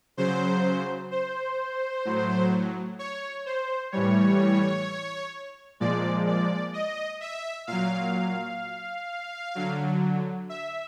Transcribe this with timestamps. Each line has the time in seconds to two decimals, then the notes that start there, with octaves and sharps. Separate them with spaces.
0.17 C#3 F#3 C5
1.11 C5
2.05 A2 F#3
2.99 C#5
3.46 C5
3.92 A2 E3 G3 C#5
5.80 A#2 F3 G#3 D5
6.27 D5
6.73 D#5
7.21 E5
7.67 A#2 F#3 F5
9.55 D3 F#3
10.49 E5